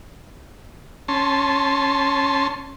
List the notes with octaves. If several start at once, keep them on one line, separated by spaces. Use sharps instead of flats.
C#4 A5 C6